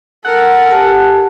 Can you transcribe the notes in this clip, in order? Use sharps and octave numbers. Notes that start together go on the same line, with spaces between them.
A4 A#4 F#5
G4 G#5 A5